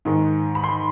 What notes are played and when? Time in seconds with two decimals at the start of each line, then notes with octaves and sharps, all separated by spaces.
0.05 G#2 D#3 G#3
0.55 B5
0.64 C6